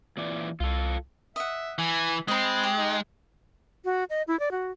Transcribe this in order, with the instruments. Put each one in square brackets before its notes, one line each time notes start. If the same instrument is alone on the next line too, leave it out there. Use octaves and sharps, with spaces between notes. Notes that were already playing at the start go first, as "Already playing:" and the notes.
[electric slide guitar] A#2 E3 D5
[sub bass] C2 [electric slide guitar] F4 A4
[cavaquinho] D#5 F#5 [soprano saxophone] E5
[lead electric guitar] E3 [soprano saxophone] G#5
[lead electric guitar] G#3 [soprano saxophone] C4 [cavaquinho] D#5 B5
[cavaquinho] G4
[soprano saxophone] D#4
[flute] F#4
D#5
E4
D5
F#4